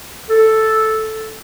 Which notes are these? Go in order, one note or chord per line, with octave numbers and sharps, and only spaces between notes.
A4